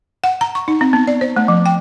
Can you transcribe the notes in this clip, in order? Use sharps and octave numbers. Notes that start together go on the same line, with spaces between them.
F#5
A#5
C#6
D#4
C4
B3
D5
C5
A3
F3
G5